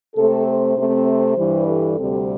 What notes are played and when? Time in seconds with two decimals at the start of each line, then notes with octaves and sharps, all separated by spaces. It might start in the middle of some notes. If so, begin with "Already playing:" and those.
0.15 C3 A3 C4 A4
0.46 C5
0.76 C3 A3 C4
1.06 C5
1.37 G2 E3 G3
1.67 A4
1.97 D2 C3 G3 C4